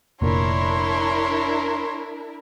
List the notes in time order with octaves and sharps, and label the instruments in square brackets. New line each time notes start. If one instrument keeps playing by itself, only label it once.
[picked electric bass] F1 A#2 [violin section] D4 E4 A#4 [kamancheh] C#5 C6